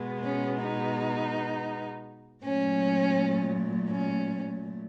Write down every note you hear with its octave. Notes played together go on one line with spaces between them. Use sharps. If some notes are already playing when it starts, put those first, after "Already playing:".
Already playing: B2 G#3 B3
C#4
D#4
A#2 F#3 A3 C#4
C#4